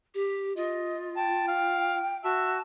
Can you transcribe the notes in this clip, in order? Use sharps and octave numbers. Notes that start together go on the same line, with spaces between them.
G4
F4 D#5
G5 A5
F5
F#4 E5 A5